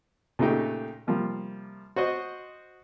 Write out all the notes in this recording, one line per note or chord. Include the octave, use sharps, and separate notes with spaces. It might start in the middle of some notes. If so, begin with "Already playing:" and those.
A#2 C#3 A3 D#4 G4
C3 F3 G3 A#3
F#4 C5 D#5